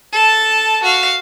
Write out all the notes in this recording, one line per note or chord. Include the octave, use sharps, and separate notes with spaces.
A4 A5
F#4 F5